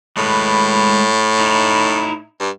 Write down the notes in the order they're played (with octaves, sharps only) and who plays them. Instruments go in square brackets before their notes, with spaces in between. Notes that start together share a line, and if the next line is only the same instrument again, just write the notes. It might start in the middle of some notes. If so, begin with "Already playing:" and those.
[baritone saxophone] A2 [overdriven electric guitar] G#3 B4
[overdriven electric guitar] D#4 E4
[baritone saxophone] G2